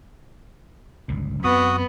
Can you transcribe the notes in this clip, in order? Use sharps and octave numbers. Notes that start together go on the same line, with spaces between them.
G1 C#2 A#2
F#2 B3 C4 F#4 D#6